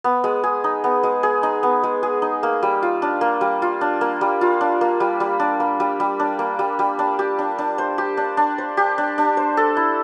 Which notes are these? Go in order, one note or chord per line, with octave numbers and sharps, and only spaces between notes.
B3
G#3
G#4
D#4
B3
G#3
G#4
D#4
B3
G#3
G#4
D#4
A#3
G3
F4
D4
A#3
G3
F4
D4
A#3
G3
F4
D4
A#3
G3
G3
D4
A#3
G3
G3
D4
A#3
G3
G3
D4
G4
D4
D4
C5
G4
D4
D4
C5
G4
D4
D4
C5
A4
E4